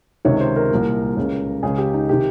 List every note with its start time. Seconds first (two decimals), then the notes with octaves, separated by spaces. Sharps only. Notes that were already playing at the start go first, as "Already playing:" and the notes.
0.25 C#2 C3 D#3 C#5
0.40 C5
0.56 A#4
0.71 C2 A#2
1.17 C#2 C#3
1.63 C#2 C#3 G#4
1.78 G4
1.94 D#4
2.09 C3 D#3 G4